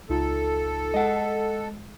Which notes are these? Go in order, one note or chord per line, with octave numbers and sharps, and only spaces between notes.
C#2 D#4 F4 A4
G#3 D#5 F#5